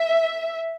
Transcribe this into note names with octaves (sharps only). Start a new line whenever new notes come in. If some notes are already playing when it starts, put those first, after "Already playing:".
Already playing: E5